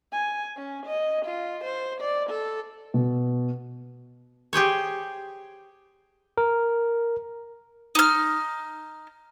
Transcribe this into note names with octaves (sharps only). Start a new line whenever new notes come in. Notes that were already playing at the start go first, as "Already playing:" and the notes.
G#5
C#4
D#5
F4
C5
D5
A4
B2
G4 G#4 C5 C#5
A#4
D#4 F6